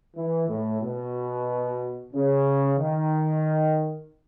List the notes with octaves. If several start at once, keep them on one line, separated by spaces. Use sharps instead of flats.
E3
A2
B2
C#3
D#3